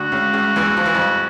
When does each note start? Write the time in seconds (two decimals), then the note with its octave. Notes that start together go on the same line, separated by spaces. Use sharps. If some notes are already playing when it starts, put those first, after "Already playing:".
Already playing: D2 D3 F#4
0.12 C#2 C#3
0.33 C#2 C#3
0.56 E2 E3
0.77 F3
0.86 E3
0.94 F2 F3